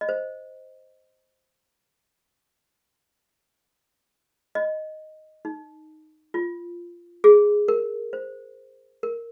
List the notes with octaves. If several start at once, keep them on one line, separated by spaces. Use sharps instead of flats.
D#5
C5
D#5
D#4
F4
G#4
A#4
C5
A#4